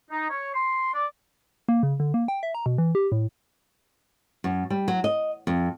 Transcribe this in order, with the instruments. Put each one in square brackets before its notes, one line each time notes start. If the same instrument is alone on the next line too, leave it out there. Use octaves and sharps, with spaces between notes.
[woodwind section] D#4
C#5
C6
D5
[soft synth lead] A#3
C#3
D3
A#3
G5
E5
A#5
B2
E3
G4
A2
[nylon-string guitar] F#2
G3
F#3
D#5
F2